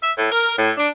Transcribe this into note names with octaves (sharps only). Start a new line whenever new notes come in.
E5
A2
A#4
A2
D4